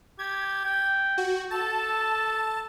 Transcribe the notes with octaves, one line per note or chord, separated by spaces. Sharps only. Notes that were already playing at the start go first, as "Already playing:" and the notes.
G4 G#6
G5
F#4
A4 A5